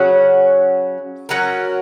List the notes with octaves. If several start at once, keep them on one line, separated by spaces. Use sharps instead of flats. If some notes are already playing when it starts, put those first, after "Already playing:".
Already playing: C#3 F#3 C#4 F#4
F#3 C#4 F#4 A#4